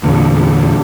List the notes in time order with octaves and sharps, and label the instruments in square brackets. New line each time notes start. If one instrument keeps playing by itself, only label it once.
[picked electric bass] E2 A#2 D3